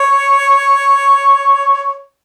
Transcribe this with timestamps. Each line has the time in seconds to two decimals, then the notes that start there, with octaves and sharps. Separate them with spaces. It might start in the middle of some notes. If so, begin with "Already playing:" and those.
Already playing: C#5